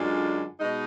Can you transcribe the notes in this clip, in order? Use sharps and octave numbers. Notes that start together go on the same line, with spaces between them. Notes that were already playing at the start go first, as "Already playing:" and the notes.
Already playing: F#2 D3 G#3 D4 F4
B2 G#3 D#4